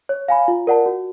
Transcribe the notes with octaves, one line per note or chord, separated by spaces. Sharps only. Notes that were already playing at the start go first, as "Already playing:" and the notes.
C#5
F5 G#5 B5
F4
A#4 D5 F#5 A5
F#4